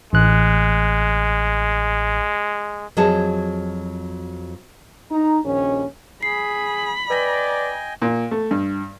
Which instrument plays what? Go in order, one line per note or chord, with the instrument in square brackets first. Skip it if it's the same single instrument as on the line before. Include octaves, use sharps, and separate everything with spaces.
[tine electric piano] A1 F#6 [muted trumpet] G#3
[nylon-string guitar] F2 F#3 F#4 G#4 D#5 A5
[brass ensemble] D#4 A#5
A#1 D#2 C#4
[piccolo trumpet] G#4 [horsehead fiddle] B5 [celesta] C7
[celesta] B4 A#6 [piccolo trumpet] D5 [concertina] D#5 G5 G#5
[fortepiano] A#2
A3
G2